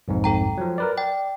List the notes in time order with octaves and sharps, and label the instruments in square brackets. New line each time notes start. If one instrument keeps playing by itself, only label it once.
[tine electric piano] B1 F2 G#2
[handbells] A4 G5 A#5
[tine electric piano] F3 F#3
A#4 B4 D5
[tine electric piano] D5 [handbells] G5